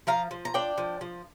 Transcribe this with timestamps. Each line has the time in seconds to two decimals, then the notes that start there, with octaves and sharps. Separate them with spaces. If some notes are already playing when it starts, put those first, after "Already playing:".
0.07 F3 F5 A#5
0.31 F3
0.45 A#5
0.54 D4 D5 G5
0.78 F3
1.01 F3